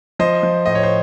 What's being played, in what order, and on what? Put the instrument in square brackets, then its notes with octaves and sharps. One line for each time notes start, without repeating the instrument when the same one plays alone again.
[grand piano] F3 C5 D#5
F3
A2 D#5
C#5
C5